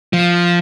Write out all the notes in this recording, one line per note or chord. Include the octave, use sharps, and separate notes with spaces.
F3